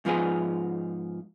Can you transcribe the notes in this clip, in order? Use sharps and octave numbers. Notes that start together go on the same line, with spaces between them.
G#2 F3 B3 F4 G#4